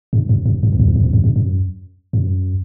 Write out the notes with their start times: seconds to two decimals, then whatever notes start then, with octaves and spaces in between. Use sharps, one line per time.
0.13 G2
0.29 F#2
0.46 F#2
0.63 F#2
0.73 E2
0.80 F#2
0.88 E2
0.96 F#2
1.04 E2
1.13 F#2
1.24 G2
1.36 F#2
2.13 F#2